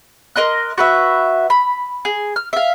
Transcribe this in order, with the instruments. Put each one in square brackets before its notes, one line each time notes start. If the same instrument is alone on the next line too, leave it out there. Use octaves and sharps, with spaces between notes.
[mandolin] A#4 D#5 C6 F#6
F#4 B4 E5
B5
G#4
F6
E5 F5